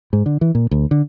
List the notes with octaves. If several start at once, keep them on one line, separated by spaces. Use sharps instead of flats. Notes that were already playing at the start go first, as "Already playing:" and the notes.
G#2
D3
E3
A#2
D2
D3